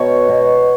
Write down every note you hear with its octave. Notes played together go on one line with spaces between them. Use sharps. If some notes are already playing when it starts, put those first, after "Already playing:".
Already playing: B2 C#5
B2